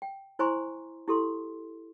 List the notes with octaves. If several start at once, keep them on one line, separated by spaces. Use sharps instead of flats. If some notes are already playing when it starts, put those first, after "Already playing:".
G5
E4 C5 G#5 A#5 C6 C#6
E4 G4 A4 C6